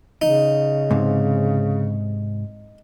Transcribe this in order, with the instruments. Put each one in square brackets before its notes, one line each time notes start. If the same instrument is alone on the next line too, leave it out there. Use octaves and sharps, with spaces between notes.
[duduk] C#3 [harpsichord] D#4
[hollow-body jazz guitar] G#2 C3